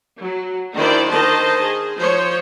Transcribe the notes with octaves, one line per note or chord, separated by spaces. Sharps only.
F#3
D#3 D4 E4 C5 D5
D#3 C5 D#5 A5
G#4
F3 C5 C#5